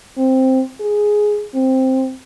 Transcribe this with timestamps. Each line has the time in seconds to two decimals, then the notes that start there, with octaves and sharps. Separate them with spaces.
0.18 C4
0.81 G#4
1.54 C4